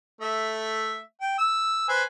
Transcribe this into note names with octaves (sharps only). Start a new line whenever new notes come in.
A3 E5
G5
E6
B4 C5 G#5